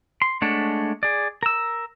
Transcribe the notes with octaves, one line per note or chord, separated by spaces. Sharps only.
C6
G#3 A3 D4 C#5 F#5
G#4 D5
A#4 E6